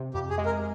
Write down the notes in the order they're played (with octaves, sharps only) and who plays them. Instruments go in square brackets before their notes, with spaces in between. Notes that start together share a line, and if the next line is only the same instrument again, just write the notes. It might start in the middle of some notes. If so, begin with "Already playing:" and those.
Already playing: [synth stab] C3
[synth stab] F2 [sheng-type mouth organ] G4
[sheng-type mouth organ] G#4
[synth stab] G#3
[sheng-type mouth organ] A#4